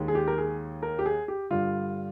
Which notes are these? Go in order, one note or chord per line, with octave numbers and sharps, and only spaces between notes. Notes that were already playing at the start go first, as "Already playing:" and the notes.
Already playing: D#2 D#3 G#3
G#4
G4
A#4
G#4
A#4
G4
G#4
G4
G2 D3 G3 F4